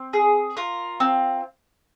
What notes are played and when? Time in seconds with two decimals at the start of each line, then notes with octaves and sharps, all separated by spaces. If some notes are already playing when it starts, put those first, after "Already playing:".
Already playing: C4
0.13 G#4
0.57 F4 A#4
1.00 C4